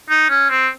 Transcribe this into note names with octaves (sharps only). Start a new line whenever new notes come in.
D#4
C#4
C4